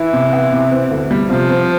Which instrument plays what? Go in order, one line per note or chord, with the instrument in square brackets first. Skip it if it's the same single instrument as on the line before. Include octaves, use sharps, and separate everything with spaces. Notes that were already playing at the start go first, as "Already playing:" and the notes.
Already playing: [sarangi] E3 [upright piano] E4
[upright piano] C3
B3
C3
C4
D2
G3
[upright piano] C3 [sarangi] F3
[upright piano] C4